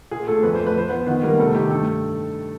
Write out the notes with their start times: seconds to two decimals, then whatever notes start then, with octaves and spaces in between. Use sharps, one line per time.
0.11 A#2 G#4
0.27 A#2 A3 A4
0.43 F2 B4
0.55 A3 C5
0.67 B4
0.76 F3 C5
0.89 F3 B3 B4
1.07 D#3 B3 B4
1.23 G3 A#3 A#4
1.39 C3 A3 A4
1.55 D#3 G4
1.70 G2 A3 A4